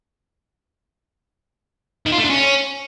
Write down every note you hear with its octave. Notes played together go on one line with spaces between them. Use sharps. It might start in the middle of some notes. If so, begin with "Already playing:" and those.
D#3
F4
A3
D4
C#4